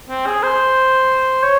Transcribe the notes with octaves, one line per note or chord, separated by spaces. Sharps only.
C4
G#4
C5
C#5